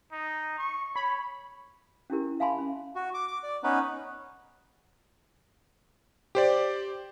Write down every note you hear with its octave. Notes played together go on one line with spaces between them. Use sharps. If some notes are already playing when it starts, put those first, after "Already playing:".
D#4
C#6
C#5 B5
C#4 D4 E4 G4 A#4
E5 F5 G#5 A5 B5 C6
C#4
F#4
D6
D6
D5
B3 C#4 D#4 B4
G4 C5 D5